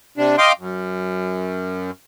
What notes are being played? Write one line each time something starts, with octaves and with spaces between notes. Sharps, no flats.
C3 D4
D#5 F5 G5 C6 D6
F#2